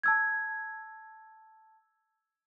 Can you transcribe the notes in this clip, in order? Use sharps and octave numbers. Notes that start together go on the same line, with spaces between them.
A5 E6 G#6